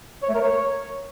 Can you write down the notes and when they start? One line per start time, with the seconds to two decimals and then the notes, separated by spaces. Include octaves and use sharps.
0.23 C#5
0.29 A3
0.35 A#4
0.41 C#5